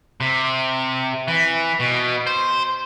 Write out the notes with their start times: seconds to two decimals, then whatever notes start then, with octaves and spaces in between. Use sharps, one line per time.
0.21 C3
1.28 E3
1.80 B2
2.27 C5